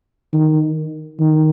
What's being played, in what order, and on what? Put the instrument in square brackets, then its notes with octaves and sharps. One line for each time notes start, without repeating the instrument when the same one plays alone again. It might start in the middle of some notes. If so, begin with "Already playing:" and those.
[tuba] D#3
D#3